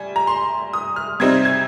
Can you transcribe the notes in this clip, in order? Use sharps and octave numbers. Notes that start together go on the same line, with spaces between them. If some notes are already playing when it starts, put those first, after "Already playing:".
Already playing: G3 G#5
A#5
C6
D#6
F6
C3 G3 C4 D#4 G#6
G#6